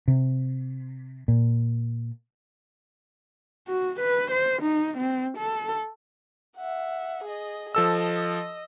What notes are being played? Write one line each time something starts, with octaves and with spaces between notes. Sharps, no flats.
C3
A#2
F#4
B4
C5
D#4
C4
A4
E5 F#5
G#4 D#5
F3 A4 D#5 E6